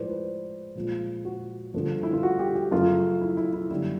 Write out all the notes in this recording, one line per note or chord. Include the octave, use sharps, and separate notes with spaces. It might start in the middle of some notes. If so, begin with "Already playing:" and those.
Already playing: A2 F3 G#3 C5 D5
B4
A#2 F3 G#3
F#4
G2 D3 F3 A3
E4
F4
F#4
G4
G4
F#2 C#3 F3 A3 F4
E4
E4
E4
F#2 D3 G3 A#3 E4